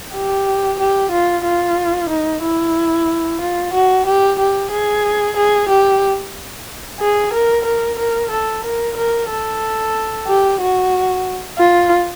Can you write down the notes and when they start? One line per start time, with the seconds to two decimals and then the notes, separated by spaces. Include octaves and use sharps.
0.14 G4
0.79 G4
1.11 F4
1.44 F4
2.10 D#4
2.43 E4
3.41 F4
3.73 F#4
4.06 G4
4.39 G4
4.71 G#4
5.36 G#4
5.69 G4
7.00 G#4
7.33 A#4
7.65 A#4
7.99 A#4
8.31 A4
8.64 A#4
8.97 A#4
9.29 A4
10.27 G4
10.61 F#4
11.58 F4